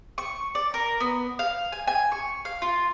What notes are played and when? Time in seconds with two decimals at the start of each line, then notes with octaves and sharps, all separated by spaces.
0.18 C#6
0.55 D5
0.74 A#4
1.00 B3
1.39 F5
1.72 G#5
1.87 G#5
2.12 C#6
2.45 F5
2.62 F4